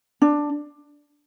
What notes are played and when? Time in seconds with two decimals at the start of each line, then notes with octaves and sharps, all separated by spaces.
0.22 D4